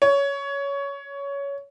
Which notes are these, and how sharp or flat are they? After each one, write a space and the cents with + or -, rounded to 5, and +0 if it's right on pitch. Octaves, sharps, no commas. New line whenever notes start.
C#5 +15